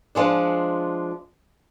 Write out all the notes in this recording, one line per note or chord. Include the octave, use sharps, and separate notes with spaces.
F3 G#3 D4